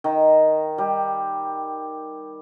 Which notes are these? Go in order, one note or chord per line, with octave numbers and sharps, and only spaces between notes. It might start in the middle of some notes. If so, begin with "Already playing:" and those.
D#3
G3